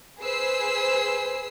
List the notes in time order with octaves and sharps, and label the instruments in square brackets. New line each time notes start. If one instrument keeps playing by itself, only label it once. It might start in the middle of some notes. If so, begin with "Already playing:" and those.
[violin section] G#4 B4 C5 E6 C7